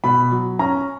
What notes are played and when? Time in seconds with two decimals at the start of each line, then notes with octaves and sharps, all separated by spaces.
0.04 B2 B5
0.32 F#3
0.59 C#4 A#5